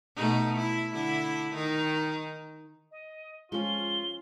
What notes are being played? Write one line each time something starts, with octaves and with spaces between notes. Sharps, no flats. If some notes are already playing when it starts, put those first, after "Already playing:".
B2 A3 D#4
E4
D3 E4
D#3 D#4
D#5
F3 G#3 C#4 F4 G7